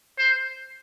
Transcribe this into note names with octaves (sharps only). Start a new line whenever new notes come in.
C5